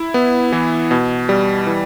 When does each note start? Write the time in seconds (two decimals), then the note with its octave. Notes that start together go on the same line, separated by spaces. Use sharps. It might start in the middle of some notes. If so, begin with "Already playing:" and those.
Already playing: E4
0.14 B3
0.52 E3
0.91 B2
1.29 G3
1.67 E3